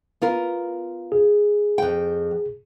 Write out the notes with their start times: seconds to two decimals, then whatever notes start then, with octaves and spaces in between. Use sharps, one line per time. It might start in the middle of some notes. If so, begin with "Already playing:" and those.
0.22 B3 F4 A#4
1.12 G#4
1.78 F2 G5